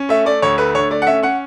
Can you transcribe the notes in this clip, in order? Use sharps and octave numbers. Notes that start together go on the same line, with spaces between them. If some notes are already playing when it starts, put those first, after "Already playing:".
Already playing: C#4
A3 E5
A3 D5
D2 C#5
A3 B4
D3 C#5
A3 D5
F#5
C#4 E5
C#4 F#5